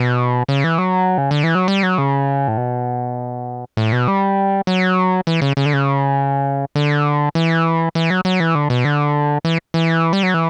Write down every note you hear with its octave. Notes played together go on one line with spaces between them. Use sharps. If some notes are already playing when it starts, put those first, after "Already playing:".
Already playing: B2
C#3
E3
F#3
C#3
D3
E3
F#3
G3
F#3
C#3
A2
B2
A2
B2
G3
F#3
E3
C#3
C#3
D3
C#3
D3
E3
E3
F#3
F#3
E3
D3
B2
D3
E3
E3
G3
F#3
E3